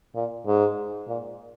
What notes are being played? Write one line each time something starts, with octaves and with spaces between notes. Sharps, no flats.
A#2
G#2
A#2